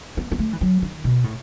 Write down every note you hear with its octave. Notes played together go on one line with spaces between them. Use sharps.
B3
B3
A3
E3
F#3
D#3
B2
A2